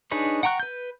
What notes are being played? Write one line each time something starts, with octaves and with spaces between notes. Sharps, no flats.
D4 D#4 G#4 B4 C#5
F#5 G5 A#5 C#6 F#6
B4 G6